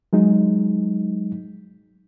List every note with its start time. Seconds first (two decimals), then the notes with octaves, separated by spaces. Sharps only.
0.13 F#3 G#3 D#4